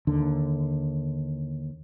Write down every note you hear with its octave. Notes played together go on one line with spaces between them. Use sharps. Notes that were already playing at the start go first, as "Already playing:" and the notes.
D#2 D3